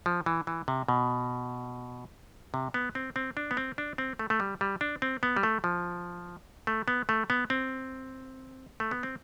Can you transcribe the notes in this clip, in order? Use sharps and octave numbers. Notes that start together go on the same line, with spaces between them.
F3
E3
E3
C3
B2
C3
B3
C4
C4
D4
B3
C4
D4
C4
A3
A3
G3
G3
D4
C4
B3
G3
A3
F3
A3
B3
A3
B3
C4
A3
B3
C4